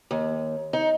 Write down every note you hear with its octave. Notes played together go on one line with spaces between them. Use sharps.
D#2
D#4